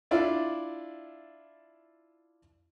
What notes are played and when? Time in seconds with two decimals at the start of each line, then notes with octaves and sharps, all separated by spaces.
0.11 D4 E4 F4 D5